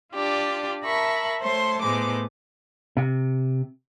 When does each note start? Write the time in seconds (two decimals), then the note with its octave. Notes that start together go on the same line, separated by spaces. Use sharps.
0.14 D4 F4 G4 D5
0.82 A#4 E5 A5 B5 C#6
1.41 A3 C5 C#5 A5 C6
1.81 A2 G#3 A3 B3 C5 D6
2.97 C3